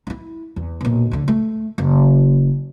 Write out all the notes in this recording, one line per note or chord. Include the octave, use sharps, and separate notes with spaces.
D#4 E4
E2
B1 A#2
D2 D3
A3
F#1